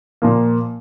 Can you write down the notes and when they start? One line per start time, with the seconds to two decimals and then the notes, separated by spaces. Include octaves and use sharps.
0.22 A#2 F3 A#3